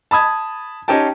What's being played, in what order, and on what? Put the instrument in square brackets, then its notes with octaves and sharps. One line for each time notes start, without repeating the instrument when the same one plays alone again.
[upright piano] A5 B5 D#6 G#6
C#4 D#4 G4 G5 A5